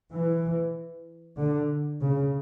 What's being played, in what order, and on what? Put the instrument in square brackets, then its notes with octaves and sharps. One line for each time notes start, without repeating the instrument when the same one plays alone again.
[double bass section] E3
D3
C#3